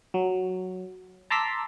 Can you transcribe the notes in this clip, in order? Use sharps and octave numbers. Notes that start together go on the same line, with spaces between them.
F#3
A5 A#5 C6 D6 E6 B6